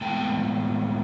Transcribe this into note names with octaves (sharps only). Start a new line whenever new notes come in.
A2 E3 G#3 B3 G5 A5